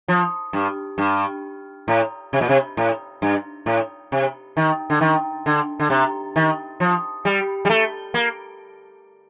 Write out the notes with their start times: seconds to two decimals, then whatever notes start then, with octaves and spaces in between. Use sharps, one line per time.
0.08 F3
0.53 G2
0.98 G2
1.88 A2
2.33 C3
2.41 A#2
2.49 C3
2.77 A2
3.22 G2
3.66 A2
4.12 C3
4.57 D#3
4.90 D3
5.01 D#3
5.46 D3
5.80 D3
5.90 C3
6.36 D#3
6.80 F3
7.25 G3
7.65 G3
7.70 A3
8.14 A#3